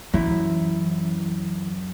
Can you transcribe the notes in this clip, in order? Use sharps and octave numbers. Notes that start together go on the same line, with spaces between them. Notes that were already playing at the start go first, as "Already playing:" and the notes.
F#2 E3 E4